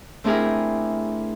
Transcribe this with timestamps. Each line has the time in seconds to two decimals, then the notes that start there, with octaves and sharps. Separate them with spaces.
0.24 A3 C4 D4 E4 G#4 A#4